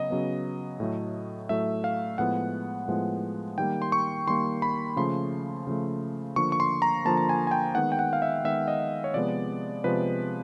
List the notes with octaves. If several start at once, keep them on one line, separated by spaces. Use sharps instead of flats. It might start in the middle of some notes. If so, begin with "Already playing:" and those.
Already playing: C#3 F#3 B3 D#5
C#3 F#3 B3
A2 F#3 A3
A2 F#3 A3 E5
F5
A2 F3 G#3 B3 F#5
A2 F3 G#3 B3
D#3 G3 A#3 G5
C6
C#6
D#3 G3 A#3 C6
B5
C#3 F3 A3 C6
C#3 F3 A3
D3 F3 A#3 C#6
C#6
C6
A#5
D3 F3 A#3 A5
A5
G#5
G#5
G5
D#3 G#3 B3 F#5
G5
F#5
F5
E5
D#3 G#3 B3 E5
D#5
C#5
C3 F3 G#3 B3 D5
C3 F3 G#3 B3 B4